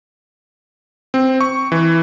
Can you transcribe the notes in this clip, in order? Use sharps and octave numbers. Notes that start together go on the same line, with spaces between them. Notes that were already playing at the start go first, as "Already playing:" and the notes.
C4
C#6
E3